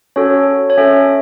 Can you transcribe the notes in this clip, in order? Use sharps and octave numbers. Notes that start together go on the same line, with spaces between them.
C#4 F#4 A4 C#5
C#5
C#4 A4 E5